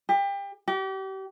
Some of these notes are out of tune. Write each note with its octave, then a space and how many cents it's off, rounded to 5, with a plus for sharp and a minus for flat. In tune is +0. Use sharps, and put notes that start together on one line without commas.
G4 +30
G4 -35